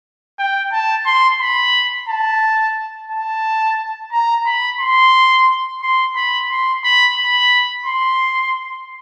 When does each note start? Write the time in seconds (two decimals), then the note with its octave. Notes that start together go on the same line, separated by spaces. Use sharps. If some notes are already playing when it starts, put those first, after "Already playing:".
0.39 G5
0.72 A5
1.06 C6
1.40 B5
2.08 A5
3.10 A5
4.12 A#5
4.46 B5
4.80 C6
5.82 C6
6.16 B5
6.50 C6
6.84 B5
7.18 B5
7.86 C6